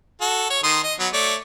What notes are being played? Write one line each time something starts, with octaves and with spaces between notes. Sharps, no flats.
F#4 A4
C#5
D#3 C6 D#6
D#5
F#3 B3
A3 C#5 D5